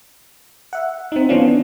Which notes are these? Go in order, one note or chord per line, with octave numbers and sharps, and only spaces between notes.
E5 F#5
C4 D#4
E3 B3 C#4 D4 F4